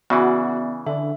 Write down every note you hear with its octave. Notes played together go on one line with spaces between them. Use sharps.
C#3 E3 B3 F#4 D5 E5
D3 E5